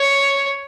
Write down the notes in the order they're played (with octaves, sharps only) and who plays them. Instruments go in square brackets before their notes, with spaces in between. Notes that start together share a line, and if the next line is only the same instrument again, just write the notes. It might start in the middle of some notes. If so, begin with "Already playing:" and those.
Already playing: [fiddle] C#5